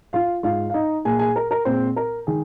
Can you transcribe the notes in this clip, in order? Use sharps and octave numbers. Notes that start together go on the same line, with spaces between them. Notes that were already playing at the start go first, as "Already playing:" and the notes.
F4 F5
G#2 G#3 F4 F5
F5
D#4 D#5
A#2 A#3 G#4 G#5
G#4 G#5
A#4
A#4
A#2 G#3 C4 C5
A#4
D#3 G#3 G#4